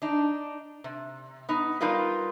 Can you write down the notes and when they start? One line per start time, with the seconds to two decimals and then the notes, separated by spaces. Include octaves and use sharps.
0.02 D4 D#4
0.84 C3
1.49 B3 D#4
1.81 G3 D#4 F4 A#4 B4